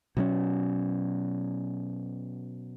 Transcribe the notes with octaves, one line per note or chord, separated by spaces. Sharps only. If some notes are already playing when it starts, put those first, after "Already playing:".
B2 F#3 C#4